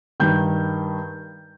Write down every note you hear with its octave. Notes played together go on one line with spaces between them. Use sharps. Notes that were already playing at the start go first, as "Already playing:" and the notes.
G2 D#3 G6